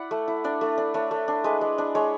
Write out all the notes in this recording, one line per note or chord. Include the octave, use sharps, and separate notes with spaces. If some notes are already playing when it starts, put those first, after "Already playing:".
Already playing: E4 D5 F#5
A3
E4
D4 D5
A3
D4
A3 C#5
A3
D4
G#3 B4
G#3
D4
G#3 C#5